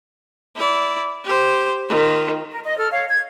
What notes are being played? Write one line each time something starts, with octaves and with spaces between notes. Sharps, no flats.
E4 D5
G4 C5
D#3 F4
A#4
D#5
A4 F6
C#5 F5
G#6